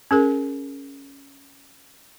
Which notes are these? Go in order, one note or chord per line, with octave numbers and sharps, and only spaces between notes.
C#4 G#4 A#4